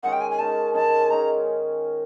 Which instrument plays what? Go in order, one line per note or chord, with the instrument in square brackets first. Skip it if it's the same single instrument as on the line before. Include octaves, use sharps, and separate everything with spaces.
[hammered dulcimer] D#3 G#3 C#4 [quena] F#5
[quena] G5
G#5
G#5
[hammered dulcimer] D#3 G#3 C#4 [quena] A5
[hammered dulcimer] D#3 G#3 C#4 [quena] A5
[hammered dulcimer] D#3 G#3 C#4 [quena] A#5